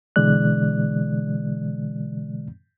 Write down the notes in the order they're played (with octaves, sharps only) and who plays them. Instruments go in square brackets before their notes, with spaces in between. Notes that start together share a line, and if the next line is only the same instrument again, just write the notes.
[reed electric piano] B2 D3 E3 G#3 D5 F#6